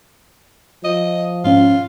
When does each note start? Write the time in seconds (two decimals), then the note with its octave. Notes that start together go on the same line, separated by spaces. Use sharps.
0.85 F3 D#5
1.44 G#2 C#4 F4